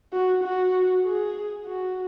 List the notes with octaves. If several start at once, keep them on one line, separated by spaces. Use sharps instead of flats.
F#4
F#4
G#4
F#4